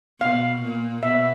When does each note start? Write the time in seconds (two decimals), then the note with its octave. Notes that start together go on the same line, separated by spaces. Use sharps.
0.20 B2 F5
0.62 A#2
1.03 B2 E5